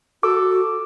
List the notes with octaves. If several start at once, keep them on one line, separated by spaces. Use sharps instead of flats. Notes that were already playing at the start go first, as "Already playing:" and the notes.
F#4 A4 D6